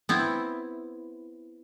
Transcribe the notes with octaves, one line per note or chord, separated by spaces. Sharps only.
B3 C4 E4